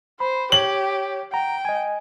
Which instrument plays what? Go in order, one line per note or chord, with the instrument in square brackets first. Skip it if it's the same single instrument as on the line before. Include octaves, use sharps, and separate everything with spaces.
[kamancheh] C5 [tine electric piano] B5
[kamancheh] G4 [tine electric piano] C#5 [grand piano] F#7
[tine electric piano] F#5 A#5 [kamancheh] G5
[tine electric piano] D#5 G#5